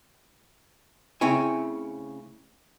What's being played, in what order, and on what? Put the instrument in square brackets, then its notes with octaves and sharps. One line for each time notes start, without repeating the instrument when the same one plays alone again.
[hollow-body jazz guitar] C#3 A3 C4 E4 C#5 G#5